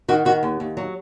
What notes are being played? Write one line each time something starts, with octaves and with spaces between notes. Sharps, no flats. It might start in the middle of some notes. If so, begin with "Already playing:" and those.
D#3 F#4
D#3 F#4
D#2
D#2
F#3